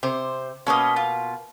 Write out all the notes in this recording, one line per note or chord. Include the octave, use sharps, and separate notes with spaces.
C3 C5
B2 A#3 C#4 B4 D#5
F4